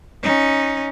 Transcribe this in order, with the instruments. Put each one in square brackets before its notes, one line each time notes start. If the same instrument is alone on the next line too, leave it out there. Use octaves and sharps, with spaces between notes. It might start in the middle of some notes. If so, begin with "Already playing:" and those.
[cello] C#4 D#4